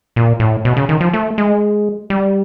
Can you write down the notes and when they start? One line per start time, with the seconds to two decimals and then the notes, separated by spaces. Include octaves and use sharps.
0.16 A#2
0.40 A2
0.65 B2
0.77 C#3
0.89 D#3
1.00 F3
1.13 A3
1.38 G#3
2.10 G3